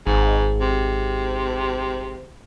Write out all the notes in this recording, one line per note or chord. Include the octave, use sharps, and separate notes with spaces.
G#1 G#2
C3